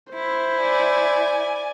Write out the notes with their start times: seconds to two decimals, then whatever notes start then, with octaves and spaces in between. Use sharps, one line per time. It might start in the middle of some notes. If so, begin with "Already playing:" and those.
0.14 E4 C5
0.61 D5 G#5